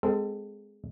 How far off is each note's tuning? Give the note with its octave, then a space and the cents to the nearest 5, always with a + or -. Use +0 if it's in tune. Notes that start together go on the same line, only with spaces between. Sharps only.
G#3 +0 C4 -25 A4 +20